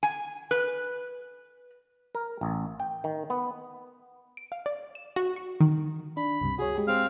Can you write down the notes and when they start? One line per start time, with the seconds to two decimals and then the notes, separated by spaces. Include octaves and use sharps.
0.03 G#5
0.51 B4
2.15 A#4
2.41 A1
2.80 G5
3.04 D#3
3.30 B3
4.37 D7
4.52 F5
4.66 D5
4.95 E7
5.16 F#4
5.36 C#6
5.60 D#3
6.17 D4 B5
6.41 C#2 G2 C3
6.58 F#4 G#4 C#5
6.76 G#3 G4
6.87 C4 F5 F6